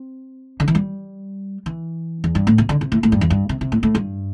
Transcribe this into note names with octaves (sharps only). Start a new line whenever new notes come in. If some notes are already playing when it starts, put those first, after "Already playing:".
Already playing: C4
D3
E3
G3
E3
E2
G2
A2
C3
D3
C3
A2
A2
G2
E2
G2
C3
C3
A2
A2
G2